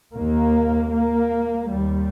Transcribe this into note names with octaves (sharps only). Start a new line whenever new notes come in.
D#2 A#3
A#3
D#2 G3